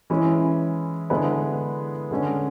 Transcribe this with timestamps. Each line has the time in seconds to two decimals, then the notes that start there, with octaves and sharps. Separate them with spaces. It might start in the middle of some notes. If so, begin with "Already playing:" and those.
0.10 E3 G#3 C#4 E4
1.10 D3 G#3 B3 E4 B4
2.11 D3 G#3 C#4